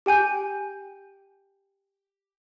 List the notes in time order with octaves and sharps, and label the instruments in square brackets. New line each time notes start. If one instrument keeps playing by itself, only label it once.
[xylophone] G4 G5 G#5 G6